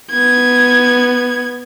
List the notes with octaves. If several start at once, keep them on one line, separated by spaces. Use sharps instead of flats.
B3 G#6